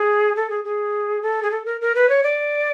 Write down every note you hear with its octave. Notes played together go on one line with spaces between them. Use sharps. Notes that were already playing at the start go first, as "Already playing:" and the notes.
Already playing: G#4
A4
G#4
G#4
A4
G#4
A4
A#4
A#4
B4
C#5
D5